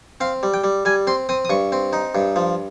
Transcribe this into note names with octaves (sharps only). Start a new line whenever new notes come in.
C4 F5
G3
G5
G3
G3 G#5
C4 C6
C4 D#6
D#6
G2 C#6
C4
D#4
G2
F3